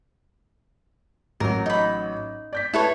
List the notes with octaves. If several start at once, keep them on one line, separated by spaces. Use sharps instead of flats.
A1 F#3 A#4
D#4 B5
D5 G6 B6
E4 A4 B4 C#5 A5